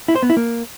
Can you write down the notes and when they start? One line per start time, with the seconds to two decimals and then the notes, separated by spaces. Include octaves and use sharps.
0.08 E4
0.15 C5
0.23 B3
0.30 E4
0.37 A#3